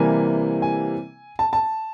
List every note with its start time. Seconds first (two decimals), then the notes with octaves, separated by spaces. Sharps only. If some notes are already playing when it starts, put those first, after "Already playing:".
Already playing: C3 E3 G3 A#3 G#5
0.62 G#5
1.39 A5
1.53 A5